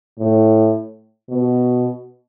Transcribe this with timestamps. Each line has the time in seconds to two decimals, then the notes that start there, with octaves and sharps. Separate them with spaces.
0.18 A2
1.29 B2